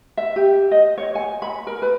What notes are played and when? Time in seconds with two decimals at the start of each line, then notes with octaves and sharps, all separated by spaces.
0.17 E5
0.36 G4
0.71 D#5
0.98 C#5
1.15 G#5
1.42 B5
1.67 A#4
1.82 B4